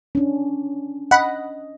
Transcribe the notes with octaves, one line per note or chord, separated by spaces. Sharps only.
C#4 D4
D#5 F#5 B5